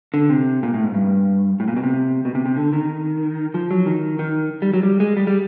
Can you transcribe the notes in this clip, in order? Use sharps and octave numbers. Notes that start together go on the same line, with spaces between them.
D3
C3
A#2
A2
G#2
G2
A2
A#2
B2
C3
B2
C3
C3
D3
D#3
F3
F#3
D#3
D#3
G3
F#3
G3
G#3
G3
G3